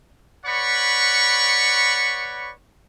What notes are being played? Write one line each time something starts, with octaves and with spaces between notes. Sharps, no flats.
B4 C#5 D5 F#5 B5 C#6